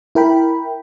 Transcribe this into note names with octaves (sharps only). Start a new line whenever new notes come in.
E4 A#4 G5 B5